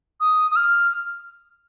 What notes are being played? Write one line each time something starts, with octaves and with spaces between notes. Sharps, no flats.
D#6
D#6
F6